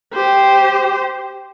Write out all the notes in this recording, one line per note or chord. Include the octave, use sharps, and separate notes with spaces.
G4 C5